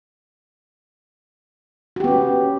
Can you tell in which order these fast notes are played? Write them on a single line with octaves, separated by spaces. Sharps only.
F#4 G4 B3 C#4